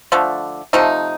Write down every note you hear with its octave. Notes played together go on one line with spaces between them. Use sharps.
D3 F3 A3
C3 F3 A3 D#4